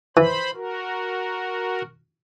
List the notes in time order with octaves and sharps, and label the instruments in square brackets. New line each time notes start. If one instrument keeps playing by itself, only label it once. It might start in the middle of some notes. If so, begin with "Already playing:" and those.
[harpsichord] E3 [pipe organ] C5 B5
[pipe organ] F#4 A#4